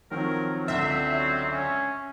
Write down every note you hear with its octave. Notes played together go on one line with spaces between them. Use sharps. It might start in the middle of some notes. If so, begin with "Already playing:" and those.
D#3 F3 F#3 C4 A#4
C#2 D3 C4 E5
F#3
C#4